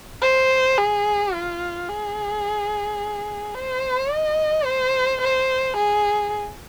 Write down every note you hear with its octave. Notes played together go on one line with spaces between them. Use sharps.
C5
G#4
F4
G#4
C5
D#5
C5
C5
G#4